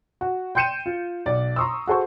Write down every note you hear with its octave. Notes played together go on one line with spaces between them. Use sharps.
F#4
G5 C6 G6 C#7 D#7 E7
F4
B1 D5
A#5 C6 C#6 D#6 E6
F#4 G#4 A4 C5 C#6